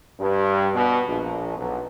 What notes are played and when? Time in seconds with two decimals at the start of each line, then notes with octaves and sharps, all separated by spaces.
0.19 G2
0.73 B2
1.07 A#1
1.57 B1